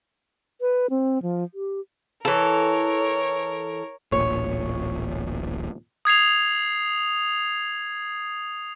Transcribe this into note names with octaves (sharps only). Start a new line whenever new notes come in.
B4
C4
F3
G4
E3 A4 A#4 C#5
D1 A1 A#2 C#5
D#6 G#6 C7 F7